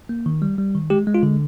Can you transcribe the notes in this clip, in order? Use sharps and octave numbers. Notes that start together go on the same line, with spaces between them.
A#3
D#3
G3
G3
D#3
G#3 G4
G#3
F4
D3